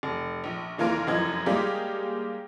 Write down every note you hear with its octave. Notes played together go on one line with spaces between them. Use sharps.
F1
A#1
F1 E3 A#3 A#4 C6 D7
F1 F#2 E3 F3 D#5 G#6
G3 G#3 A#3 D#4 G4 G#4